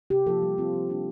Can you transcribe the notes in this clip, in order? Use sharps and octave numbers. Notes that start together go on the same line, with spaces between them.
C3 G4
F3 A#3 F4 A4
G3
C4 F4
F3
A#3 D4 F4